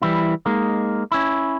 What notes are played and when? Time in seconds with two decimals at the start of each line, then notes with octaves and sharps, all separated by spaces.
0.02 E3 G3 E4
0.46 G#3 A#3 D#4
1.12 C#4 E4